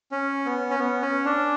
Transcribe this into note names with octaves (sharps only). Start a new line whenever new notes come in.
C#4
B3
C#4
B3
C#4
D4